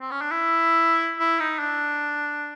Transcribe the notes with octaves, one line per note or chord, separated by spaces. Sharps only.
C4
C#4
D4
E4
E4
D#4
D4